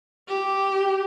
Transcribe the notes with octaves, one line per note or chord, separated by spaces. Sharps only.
G4